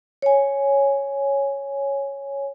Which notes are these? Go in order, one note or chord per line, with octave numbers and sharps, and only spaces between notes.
C#5 G#5